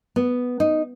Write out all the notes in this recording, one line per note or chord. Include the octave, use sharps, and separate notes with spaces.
B3
D#4